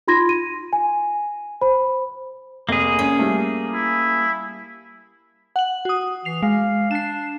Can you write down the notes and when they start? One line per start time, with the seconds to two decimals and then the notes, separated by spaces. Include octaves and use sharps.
0.08 D#4 F4 B5 C6 G#6 A#6
0.29 D#7
0.73 G#5
1.61 C5 B5
2.69 F1 A#3 G#4
2.99 C#4 D#5
3.19 G3 A3
3.73 E4
5.56 F#5 F#7
5.85 F#4 D#6
6.25 E3 C7 F7
6.42 G#3 F5
6.91 D4 C7 E7